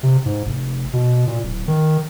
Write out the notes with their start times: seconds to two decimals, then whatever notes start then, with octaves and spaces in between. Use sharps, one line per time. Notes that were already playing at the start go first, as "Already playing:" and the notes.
0.03 C3
0.26 G#2
0.46 F1
0.93 B2
1.27 A#2
1.43 D1
1.68 D#3